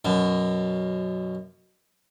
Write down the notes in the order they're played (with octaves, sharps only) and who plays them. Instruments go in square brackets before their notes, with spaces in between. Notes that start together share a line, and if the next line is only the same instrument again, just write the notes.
[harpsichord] F#2 B2